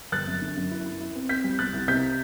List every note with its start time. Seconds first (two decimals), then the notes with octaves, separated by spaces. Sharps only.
0.12 G1 F#6 A6
0.27 F#2
0.42 D3
0.56 F#2
0.71 E4
0.86 E4
1.01 E4
1.15 C4
1.29 C4 G6 B6
1.44 G3
1.59 C2 F#6 A6
1.74 C2
1.88 C3 G6 B6